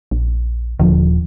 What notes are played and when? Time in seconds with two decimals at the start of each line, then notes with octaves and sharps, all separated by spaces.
0.11 A#1
0.79 D#1 D3 F3